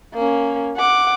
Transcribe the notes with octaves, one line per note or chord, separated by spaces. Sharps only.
A#3 C#4
F#5 D6